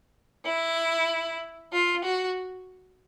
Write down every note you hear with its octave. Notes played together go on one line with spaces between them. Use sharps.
E4
F4
F#4